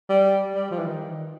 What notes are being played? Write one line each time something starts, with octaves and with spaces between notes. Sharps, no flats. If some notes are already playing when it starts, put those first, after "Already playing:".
G3
G3
F3
E3
D#3